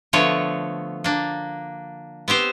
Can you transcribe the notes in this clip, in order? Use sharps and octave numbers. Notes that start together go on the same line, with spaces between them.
D3 F3 A3 B3 C#5
A#3 D4
B3 C4 G4 C5